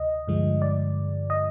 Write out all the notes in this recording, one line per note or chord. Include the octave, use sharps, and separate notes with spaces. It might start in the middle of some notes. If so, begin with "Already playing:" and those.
Already playing: D2 C3 D#5
G2 D3 F3 G#3
D5
D#5